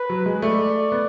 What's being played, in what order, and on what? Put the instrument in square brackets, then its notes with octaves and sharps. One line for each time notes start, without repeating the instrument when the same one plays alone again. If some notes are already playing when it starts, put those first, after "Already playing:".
Already playing: [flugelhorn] B4
[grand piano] F#3
G#3
[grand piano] A3 [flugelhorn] D5
[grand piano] B3